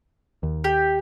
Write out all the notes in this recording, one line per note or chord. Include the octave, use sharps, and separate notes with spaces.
D#2
G4